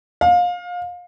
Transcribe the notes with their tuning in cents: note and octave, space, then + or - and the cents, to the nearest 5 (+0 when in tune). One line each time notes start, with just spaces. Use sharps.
F5 +25